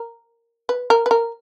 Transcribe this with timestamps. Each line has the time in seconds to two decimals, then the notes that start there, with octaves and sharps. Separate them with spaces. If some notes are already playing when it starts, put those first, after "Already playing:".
Already playing: A#4
0.69 B4
0.90 A#4
1.06 B4
1.11 A#4